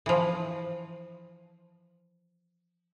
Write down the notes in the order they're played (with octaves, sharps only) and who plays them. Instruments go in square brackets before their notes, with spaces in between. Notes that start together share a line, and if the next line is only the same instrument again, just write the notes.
[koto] E3 F3